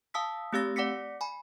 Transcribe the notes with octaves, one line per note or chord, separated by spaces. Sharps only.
F5 A5 D#6 E6 B6
A3 C4 G4 F5 E6 A#6
D5 F#5 D6 A#6 B6 C#7
G#5 B5